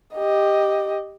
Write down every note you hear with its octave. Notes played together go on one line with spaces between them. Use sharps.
G4 D#5